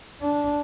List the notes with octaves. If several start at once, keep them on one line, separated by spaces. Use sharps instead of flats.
D4